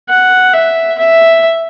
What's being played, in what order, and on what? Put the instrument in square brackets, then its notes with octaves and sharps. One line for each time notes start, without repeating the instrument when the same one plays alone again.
[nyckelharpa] F#5
E5
E5